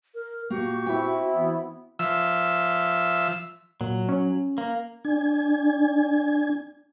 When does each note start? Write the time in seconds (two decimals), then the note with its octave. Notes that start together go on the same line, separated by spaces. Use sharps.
0.14 A#4
0.50 A#2 A#3 F#4 G4 C#6
0.86 C4 E4 E5 G5
1.32 E3 B3
1.99 F3 E5 E6
3.81 A#2 F#3
4.09 C#4
4.58 A#3
5.05 D4 G#5